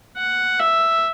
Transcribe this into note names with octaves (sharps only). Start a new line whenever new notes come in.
F#5
E5